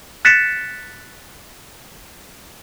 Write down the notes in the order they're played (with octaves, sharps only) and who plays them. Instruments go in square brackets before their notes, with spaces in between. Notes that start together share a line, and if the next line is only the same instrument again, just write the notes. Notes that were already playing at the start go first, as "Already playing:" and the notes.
[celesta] F#6 A6 B6 C#7 E7